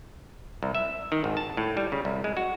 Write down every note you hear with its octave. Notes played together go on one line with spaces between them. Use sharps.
C2
E5
D#3
G#1
A5
A2
G3
C#3
C2
G#3
F#4